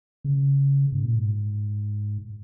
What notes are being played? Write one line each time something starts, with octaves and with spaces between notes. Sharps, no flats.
C#3
G#2
A#2
G#2